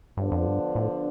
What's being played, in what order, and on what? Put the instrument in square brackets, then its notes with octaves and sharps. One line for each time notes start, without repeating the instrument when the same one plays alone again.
[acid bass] G2 [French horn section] D3 F3 B3 D4
[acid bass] F2
G2
A2